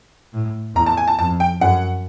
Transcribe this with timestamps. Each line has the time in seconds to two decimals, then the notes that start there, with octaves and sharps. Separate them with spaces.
0.34 A2
0.76 E2 A#5
0.86 A5
0.97 G#5
1.08 A5
1.19 F2 A5
1.40 G5
1.61 F#2 F#5